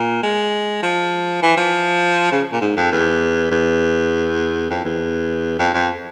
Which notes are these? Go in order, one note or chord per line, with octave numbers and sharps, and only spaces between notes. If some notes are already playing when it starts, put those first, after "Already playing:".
Already playing: A#2
G#3
F3
E3
F3
C#3
A#2
G#2
F2
E2
E2
F2
E2
F2
F2